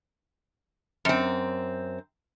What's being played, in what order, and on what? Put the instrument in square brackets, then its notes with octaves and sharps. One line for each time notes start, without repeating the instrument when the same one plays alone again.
[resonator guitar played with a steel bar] F#2 C4